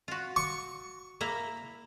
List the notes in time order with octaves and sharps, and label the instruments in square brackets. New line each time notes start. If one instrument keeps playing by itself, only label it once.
[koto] F4 F#4
[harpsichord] C#6
[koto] A#3 E4 A#5